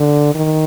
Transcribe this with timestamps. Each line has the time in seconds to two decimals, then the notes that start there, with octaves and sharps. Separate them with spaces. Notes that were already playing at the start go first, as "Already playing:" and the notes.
Already playing: D3
0.35 D#3